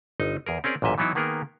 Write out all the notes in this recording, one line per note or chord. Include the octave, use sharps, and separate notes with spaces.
G1 D#4 D#5
E2 G#4 A#4
C4 C#4 G#4 A#4 D5
A1 F#2 A#2 D#5 E5
E3 F#3 B3 D#4 E4
D#3 A#3 B3 G#4 A#4